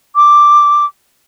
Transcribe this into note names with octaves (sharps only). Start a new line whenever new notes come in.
D6